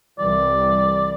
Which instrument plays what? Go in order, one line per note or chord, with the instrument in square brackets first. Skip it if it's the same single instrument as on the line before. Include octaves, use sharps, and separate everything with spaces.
[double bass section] C2 E3 G3 [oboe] D5